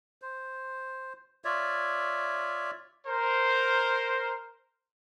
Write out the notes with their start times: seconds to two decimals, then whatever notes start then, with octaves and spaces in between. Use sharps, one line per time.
0.22 C5
1.44 F4 C#5 D5 E5
3.07 A#4 C5